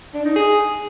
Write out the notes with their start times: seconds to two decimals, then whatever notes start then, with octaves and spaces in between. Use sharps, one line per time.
0.14 D4
0.25 D#4
0.36 G#4